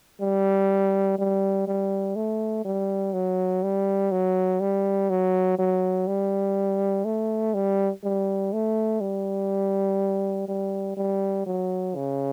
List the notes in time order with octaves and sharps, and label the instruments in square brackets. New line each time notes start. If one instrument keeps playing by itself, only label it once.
[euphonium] G3
G3
G3
A3
G3
F#3
G3
F#3
G3
F#3
F#3
G3
A3
G3
G3
A3
G3
G3
G3
F#3
C#3